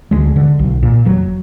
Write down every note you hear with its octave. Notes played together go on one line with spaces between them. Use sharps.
D2 G#3
D3
B1
A#2
F1 F#3